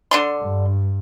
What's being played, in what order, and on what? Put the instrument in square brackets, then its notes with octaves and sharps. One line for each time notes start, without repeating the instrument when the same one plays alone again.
[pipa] D3 D4 C6
[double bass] G2